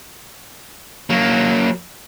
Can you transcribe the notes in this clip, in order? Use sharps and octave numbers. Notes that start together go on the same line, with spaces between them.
F#3 A#3